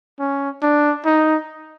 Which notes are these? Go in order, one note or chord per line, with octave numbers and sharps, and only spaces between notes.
C#4
D4
D#4